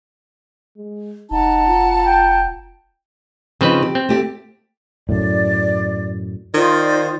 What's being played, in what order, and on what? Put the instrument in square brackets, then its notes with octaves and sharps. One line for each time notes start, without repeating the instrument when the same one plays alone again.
[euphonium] G#3
[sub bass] F1 [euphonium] D#4 [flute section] F#5 A5 A#5
[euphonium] F4
[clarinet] G5
[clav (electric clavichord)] C#3 C4 B4 [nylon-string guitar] F3 D#4
[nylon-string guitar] G4
[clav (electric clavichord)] C4
[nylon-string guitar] A3 G4
[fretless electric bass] F#2 A2 [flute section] D5
[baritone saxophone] D#3 [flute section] F4 C5 D5